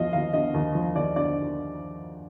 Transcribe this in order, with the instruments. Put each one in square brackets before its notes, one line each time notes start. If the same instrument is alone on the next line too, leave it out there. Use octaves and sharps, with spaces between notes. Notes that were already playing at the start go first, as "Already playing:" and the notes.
Already playing: [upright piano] D#2 F3 D#5 F5
D#2 F5
D3 D#5
D#2
F3
D#2 D5
D3 D5